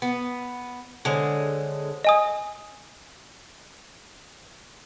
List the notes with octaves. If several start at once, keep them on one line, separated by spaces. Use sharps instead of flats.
B3
D3 G#3 A4 C5 C#5
D#5 G#5 D#6